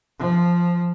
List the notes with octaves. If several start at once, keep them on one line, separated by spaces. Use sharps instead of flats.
F3